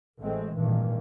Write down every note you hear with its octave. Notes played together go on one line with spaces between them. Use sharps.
A1 G#3 A3 C4
G#1 G2 A#2 E3